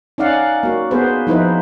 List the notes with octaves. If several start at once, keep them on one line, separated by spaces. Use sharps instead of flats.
C#4 D#4 D5 F5 F#5
A#3 F#4
B3 G#4 B4 C5
F3 D#4 E4 B4 C5